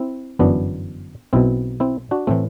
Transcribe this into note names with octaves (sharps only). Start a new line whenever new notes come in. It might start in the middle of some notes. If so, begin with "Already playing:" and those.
Already playing: C4 E4
G1 F#2 E3 B3 D4
B1 B2 C4 E4
C4 E4
D4 F#4
A2 E3 A3 C4